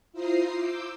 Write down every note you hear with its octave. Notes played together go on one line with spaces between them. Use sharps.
E4 F4 C5 A#5 D#6 C7
D6 E6 G6